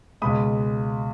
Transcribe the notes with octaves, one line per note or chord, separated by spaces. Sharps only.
C#2 B2 G#3 B5 D#6